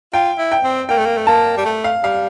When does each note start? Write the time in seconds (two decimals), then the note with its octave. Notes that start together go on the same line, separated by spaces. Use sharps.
0.13 F4 G5
0.38 E4
0.52 G5
0.64 C4
0.89 A#3 G5
0.98 A3
1.06 A#3
1.17 A3
1.27 A#3 A5
1.57 G3
1.65 A3
1.84 F5
2.03 G3 F5